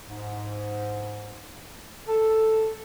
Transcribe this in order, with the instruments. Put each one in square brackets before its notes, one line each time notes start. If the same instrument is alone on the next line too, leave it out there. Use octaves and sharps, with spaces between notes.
[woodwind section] G#2
A4